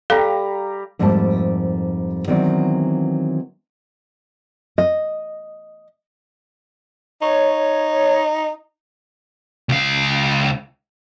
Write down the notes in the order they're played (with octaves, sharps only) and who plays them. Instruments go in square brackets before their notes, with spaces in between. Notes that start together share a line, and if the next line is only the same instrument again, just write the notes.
[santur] G3 A#5 [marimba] A4 [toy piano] F5
[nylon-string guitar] F2 G#2 G3 A3 A#3 A5
D#3 E3 F#3 B3 C4 D5
D#5
[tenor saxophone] D#4 [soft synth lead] C#5
[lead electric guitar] C#2 F5